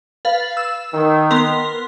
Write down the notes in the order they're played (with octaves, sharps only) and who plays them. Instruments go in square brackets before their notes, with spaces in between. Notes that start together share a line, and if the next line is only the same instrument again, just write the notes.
[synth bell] B4 F5 A6
E6
[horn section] D#3
[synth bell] B3 A#4 C6